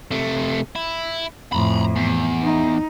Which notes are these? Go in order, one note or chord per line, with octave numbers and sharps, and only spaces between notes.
C3 A3
E4
F2 A2 A#5 B5
E2
D#4